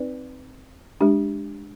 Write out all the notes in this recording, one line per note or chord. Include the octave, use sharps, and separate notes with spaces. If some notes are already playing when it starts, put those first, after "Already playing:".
Already playing: C4 D#4 B4 D5
G#3 D4 G4